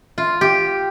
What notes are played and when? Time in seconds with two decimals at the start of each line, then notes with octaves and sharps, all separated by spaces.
0.18 F4
0.41 G4